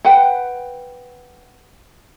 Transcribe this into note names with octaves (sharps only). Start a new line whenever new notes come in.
B4 F#5 G5